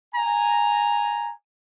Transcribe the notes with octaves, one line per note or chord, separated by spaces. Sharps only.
G#5 A#5